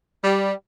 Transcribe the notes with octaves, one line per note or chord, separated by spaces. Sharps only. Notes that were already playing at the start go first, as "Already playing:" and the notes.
G3